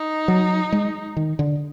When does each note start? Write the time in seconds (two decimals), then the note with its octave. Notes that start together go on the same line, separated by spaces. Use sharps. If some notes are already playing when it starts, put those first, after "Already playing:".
Already playing: D#4
0.28 F#3
0.72 G#3
1.17 D#3
1.39 D3